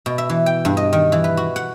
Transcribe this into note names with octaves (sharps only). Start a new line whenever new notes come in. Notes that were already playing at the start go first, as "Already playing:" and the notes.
B2
E5
E3
G5
G2
D#5
D#3
E3
B4
F#4
F#5